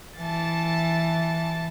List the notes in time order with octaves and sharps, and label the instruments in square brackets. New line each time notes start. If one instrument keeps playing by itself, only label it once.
[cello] E3 [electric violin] A5 A6